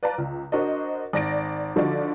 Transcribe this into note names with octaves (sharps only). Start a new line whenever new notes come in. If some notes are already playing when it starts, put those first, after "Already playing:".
B4 D5 F5 A5 A#5
C#2
D4 F#4 A#4 C5 D#5
G#1 D5 A#6 D7
D3 F3 D#4 F#4 D5